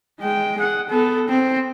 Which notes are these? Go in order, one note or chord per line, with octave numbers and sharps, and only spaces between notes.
G#3 G5
G#4 F#5
B3 A4
C4